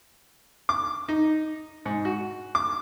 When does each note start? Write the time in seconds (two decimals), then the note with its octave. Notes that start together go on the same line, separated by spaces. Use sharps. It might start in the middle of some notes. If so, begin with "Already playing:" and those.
0.69 D6
1.09 D#4
1.86 G#2
2.05 F#4
2.55 D6